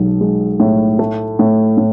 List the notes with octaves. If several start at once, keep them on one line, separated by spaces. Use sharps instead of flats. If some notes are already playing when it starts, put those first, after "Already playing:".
Already playing: B1 G#3
G#3
A2
A3
A2
A2